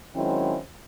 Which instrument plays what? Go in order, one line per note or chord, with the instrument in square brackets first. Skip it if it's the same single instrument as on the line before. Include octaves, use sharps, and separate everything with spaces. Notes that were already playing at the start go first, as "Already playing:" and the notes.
[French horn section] D#3 F#3 G#3 C4 C#4 E4